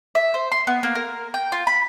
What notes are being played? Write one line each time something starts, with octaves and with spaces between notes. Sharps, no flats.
E5
C5
C6
B3
A#3
A#4
G5
F4
B5